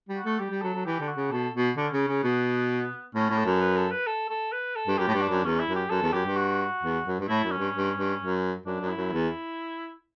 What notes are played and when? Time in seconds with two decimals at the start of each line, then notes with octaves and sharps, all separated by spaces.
0.09 G3
0.16 F#4
0.24 A3
0.39 G3 G4
0.50 G3
0.62 F#3 A4
0.74 F#3
0.85 E3 G4
1.00 D3
1.08 F#4
1.16 C#3
1.31 B2 A4
1.54 B2
1.77 D3 C#4
1.92 C#3
2.08 C#3
2.23 B2 B3
3.15 A2 C#4
3.30 A2
3.38 A4
3.45 F#2
3.61 B4
3.76 A4
3.91 B4
4.07 A4
4.30 A4
4.52 B4
4.75 A4
4.87 G2
4.98 F#2 G4
5.07 A2
5.14 G2
5.21 D4
5.29 F#2
5.44 E2 C#4
5.60 E4
5.68 F#2
5.75 G4
5.90 F#2 A4
6.02 E2
6.13 F#2 G4
6.25 G2
6.36 F#4
6.83 E2
7.06 F#2
7.20 G2
7.28 A2 E4
7.44 F#2
7.51 C#4
7.58 G2
7.75 G2
7.97 G2
8.20 F#2
8.66 F#2 D4
8.81 F#2
8.89 E4
8.97 F#2
9.12 E2